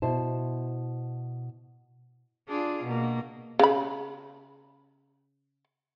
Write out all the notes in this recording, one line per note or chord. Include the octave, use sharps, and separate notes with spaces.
B2 E4 C5 A5
D4 F4 G#4
B2 A#3
C#3 B5